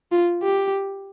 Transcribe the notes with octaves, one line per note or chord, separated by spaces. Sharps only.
F4
G4